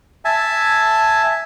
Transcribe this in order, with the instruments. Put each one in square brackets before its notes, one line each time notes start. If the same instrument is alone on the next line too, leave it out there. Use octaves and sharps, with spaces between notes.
[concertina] E5 G#5 A5